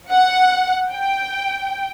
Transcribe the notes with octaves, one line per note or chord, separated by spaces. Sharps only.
F#5
G5